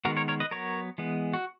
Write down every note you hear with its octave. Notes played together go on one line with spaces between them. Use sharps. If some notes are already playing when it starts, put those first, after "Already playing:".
D#3 G#3 B3 F#4 A#4
A#4 C#5
A#4 C#5
B4 D#5
F#3 B3 A#4 C#5
E3 G#3 B3
F#4